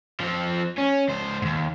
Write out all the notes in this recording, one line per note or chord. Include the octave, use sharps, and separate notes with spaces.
F3 C4
C#4
C#2 C5
D#2 G#2